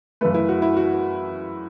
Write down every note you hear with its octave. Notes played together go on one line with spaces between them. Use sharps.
F#2 C#3 A3 B4
E4
F#4
E4
F#4